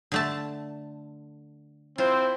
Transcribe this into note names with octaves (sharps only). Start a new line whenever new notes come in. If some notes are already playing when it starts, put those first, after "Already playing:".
D3 A3 A5
C4 E4 F4 C5